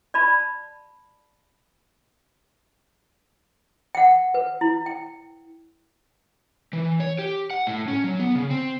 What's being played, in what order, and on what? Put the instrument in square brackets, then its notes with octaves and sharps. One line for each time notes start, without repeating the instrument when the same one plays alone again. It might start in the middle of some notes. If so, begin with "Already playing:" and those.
[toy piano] D5 A5 B5
F#5 G5
B4
E4
G5
[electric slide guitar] E3
C#5
G4
F#5
A2
C#4
F#3
B3
C#3
C4